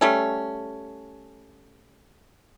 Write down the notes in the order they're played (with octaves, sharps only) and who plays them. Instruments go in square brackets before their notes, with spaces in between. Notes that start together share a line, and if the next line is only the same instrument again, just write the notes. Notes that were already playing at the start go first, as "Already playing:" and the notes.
[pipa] G3 A3 C#4